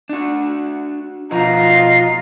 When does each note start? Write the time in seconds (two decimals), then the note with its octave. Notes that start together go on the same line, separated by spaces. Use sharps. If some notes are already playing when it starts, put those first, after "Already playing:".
0.09 D4 F#4
1.31 B2 F3 F4 F#4 D#5 A#5